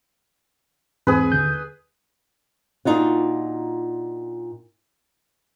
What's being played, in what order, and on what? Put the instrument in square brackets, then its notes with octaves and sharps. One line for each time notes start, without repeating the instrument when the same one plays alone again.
[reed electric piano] E2 G#2 C4 [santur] G#4 B4
[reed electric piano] D#2 D3 G6
[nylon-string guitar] A#2 D4 D#4 F4 F#4